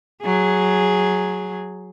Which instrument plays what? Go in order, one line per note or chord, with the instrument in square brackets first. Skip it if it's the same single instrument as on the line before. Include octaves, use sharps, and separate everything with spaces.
[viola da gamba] F#3 G#4